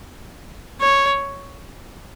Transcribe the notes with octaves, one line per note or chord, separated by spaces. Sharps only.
C#5